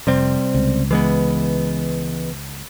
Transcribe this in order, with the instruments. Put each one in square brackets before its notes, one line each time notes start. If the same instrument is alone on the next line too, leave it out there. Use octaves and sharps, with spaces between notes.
[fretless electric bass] F1 [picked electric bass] C3 G3 C4
[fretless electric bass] C#2
[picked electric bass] E3 G#3 B3